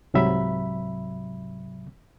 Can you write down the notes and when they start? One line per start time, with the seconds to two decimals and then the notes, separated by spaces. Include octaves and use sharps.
0.14 C2 G#2 C3 F#3 E5 B5